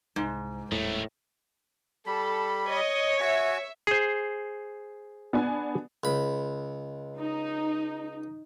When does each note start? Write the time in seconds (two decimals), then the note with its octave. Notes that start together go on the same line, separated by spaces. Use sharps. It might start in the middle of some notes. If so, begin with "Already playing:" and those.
0.16 C2 G#2
0.72 D#1 A2 D#3 A3
2.07 G3 A4 B5
2.69 C#5 D#5
3.20 F#4 E5 G#5
3.87 G#4 C5
5.33 B3 D4 G#5
6.04 C#2 B5
7.18 D#4